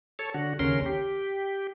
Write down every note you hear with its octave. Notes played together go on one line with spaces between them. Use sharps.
A4 C#5
D3 F#4
D#2 C#3 C#4 A#4 C6
G4